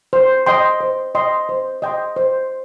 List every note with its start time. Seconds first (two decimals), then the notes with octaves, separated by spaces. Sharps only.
0.13 C5
0.46 D#5 G5 C6
0.81 C5
1.15 D#5 G5 C6
1.49 C5
1.82 D#5 G5 C6
2.16 C5